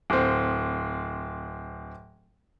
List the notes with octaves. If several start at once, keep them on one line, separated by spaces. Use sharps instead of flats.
D1 C4